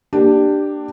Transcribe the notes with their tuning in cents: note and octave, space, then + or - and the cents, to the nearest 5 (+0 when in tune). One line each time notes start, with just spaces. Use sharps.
A#3 +0 D4 +15 G4 -5